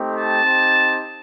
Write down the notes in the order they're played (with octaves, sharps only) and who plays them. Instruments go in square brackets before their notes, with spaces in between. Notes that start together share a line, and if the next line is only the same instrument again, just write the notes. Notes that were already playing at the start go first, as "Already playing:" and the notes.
Already playing: [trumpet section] A3 C4 D#4 G4
A5
C4 D#4 G4